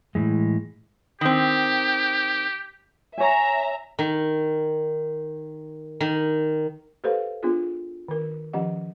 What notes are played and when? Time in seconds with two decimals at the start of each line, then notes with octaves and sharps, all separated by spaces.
0.15 A2 E3 G#3
1.21 D#3 C4 G4
3.18 C#5 E5 G#5 A#5
3.99 D#3
6.00 D#3
7.04 G4 A4 B4 C5 F5
7.43 B3 D4 F4 G#4
8.08 D#3 A#4
8.53 D#3 F3 C#4 G4 D#5 F#5